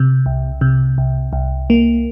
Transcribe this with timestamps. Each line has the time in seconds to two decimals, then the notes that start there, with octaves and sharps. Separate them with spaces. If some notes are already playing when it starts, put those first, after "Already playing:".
Already playing: C3
0.26 C2
0.61 C3
0.98 C2
1.33 C2
1.70 A#3